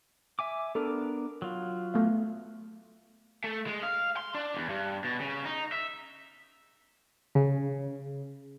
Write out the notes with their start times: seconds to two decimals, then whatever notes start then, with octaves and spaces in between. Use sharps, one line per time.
0.39 E5 G#5 D6
0.75 B3 D4 A4 A#4
1.42 F#3 F4
1.94 A3 B3 F5
3.44 A3
3.67 G#3
3.83 F5
4.17 C6
4.34 D4
4.54 E2
4.69 G2
5.04 B2
5.20 C#3
5.45 D#4
5.72 E5
7.35 C#3